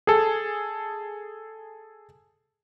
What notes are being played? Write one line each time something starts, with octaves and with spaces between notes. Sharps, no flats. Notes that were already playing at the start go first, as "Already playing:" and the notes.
G#4 A4